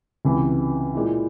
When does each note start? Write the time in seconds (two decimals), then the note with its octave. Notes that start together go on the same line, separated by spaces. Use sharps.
0.25 C#2 C3 E3
0.94 A#2 G#3 E4